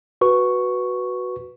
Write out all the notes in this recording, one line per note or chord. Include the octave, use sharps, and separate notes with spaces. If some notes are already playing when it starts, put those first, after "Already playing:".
F#4 B4 C#6